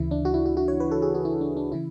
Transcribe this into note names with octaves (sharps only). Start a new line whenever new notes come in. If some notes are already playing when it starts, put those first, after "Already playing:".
Already playing: D2 C#3 E3 E4
D4
F#4
E4
F#4
F#4
C#5
B4
A4
G#4
F#4
E4
D4
D4
C#3 E3 E4